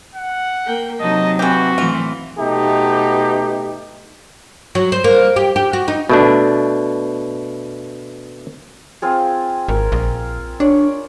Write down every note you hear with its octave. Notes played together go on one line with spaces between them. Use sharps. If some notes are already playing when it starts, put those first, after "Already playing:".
F#5
A#3 G5
C3 F#3 D#4 D#5 A5
E3 C4 F#4 G4
A2 E3 F4
B2 A3 D#4 G4
F#3
C5
A#3
G4
G4
F#4
D#4
B2 A3 D4
C4 F4 G#4
G#1 A#4
A#1 F5
D4 C#5 D5